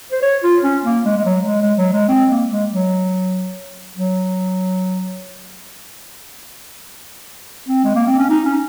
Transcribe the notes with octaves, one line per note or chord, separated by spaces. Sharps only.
C5
C#5
F4
C#4
A#3
G#3
G#3
F#3
G#3
G#3
F#3
G#3
C4
A#3
G#3
F#3
F#3
C4
G#3
A#3
C4
C#4
D#4
C#4